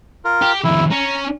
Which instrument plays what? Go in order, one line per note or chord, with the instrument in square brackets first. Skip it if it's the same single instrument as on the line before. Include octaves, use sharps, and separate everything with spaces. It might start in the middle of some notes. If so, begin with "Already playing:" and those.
[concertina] F4 A#4
[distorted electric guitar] G4
[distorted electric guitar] F2 D#3 [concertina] E4
[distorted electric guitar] C#4 [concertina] A#5